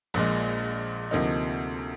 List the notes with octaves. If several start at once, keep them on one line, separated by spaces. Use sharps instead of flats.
A#1 A#2 G#3
D2 C3 F3 A#3 D#4